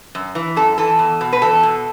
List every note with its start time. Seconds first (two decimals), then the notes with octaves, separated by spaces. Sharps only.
0.15 F#2
0.35 E3
0.56 F#2 A4
0.78 E3 A4
0.99 E2
1.21 B2
1.33 B4
1.42 E2 A4
1.63 B2